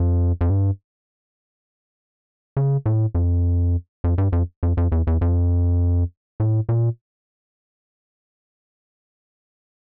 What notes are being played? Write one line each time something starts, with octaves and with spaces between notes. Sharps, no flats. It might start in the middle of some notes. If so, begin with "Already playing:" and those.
Already playing: F2
F2
G2
C#3
A2
F2
F2
G2
F2
F2
F2
E2
E2
F2
A2
A#2